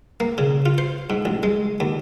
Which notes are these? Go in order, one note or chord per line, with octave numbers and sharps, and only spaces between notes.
A#3
C#3
F4
C5
G#2
A1
G#3
D#2